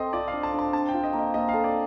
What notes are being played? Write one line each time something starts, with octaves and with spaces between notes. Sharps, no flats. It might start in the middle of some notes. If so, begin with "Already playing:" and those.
Already playing: C4 A4 D#5 C6
F4 D5
F5
D4
A5
D4
A5
D4 A5
G5
F4
D#5
A#3
D#5
A#3 D#5
A4 F5
D5